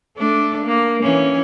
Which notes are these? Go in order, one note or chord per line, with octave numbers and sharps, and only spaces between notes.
A3 D4
A#3
E3 C#4